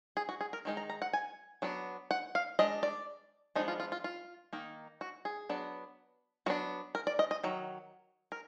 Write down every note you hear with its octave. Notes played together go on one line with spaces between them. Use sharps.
G#4
F#4
G#4
A#4
D#3 G#3 D#4
A#5
A#5
F#5
G#5
F#3 B3 D4
F#5
F5
G#3 D4 D#5
D5
F3 G#3 B3 D4 D#4
F4
F4
F4
F4
D#3 A#3 D#4
F#4
G#4
F#3 B3 D4
F#3 B3 D4 F#4
A#4
D5
D#5
D#5
D#3 F#3
A#4